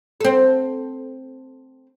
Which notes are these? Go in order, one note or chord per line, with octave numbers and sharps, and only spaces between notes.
C4 A4